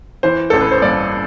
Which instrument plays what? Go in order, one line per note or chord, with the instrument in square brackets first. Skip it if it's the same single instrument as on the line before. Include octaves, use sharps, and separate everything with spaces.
[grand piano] E3 C5
A1 A4
B4
C5
G2 D5